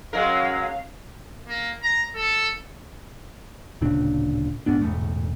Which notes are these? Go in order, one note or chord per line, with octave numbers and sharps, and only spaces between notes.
F#3 G#3 C#4 A#4 F5
A#3
A#5
A4
D1 A#2 C#3 D4
A#1 G#2 B3 D4
E1 A1 G#2 A3